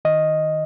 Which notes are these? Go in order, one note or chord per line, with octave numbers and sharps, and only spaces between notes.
D#3 D#5